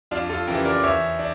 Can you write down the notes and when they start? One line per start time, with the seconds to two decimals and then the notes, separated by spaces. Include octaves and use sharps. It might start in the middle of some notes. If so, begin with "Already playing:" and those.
0.11 F2 D4 F4
0.29 F4 A4
0.47 C#3 E3 G4 A#4
0.65 A#4 D5
0.76 D5
0.83 E2 C#5 E5
1.19 D4